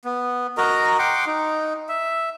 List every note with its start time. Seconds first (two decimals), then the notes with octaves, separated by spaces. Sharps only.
0.05 B3
0.57 F#4 A#4 D#5 A#5
0.99 F#5 G5 C6 D6
1.27 D#4
1.89 E5